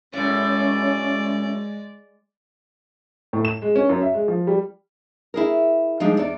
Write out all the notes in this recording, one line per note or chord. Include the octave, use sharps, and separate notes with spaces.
F#2 A2 G#3 C#4 D5
A2
E7
G#3
C#4
F#2
E5
G#3
F3
G3
E4 G#4 A#4
F3 G3 G#3 D4 D#4
E2 D5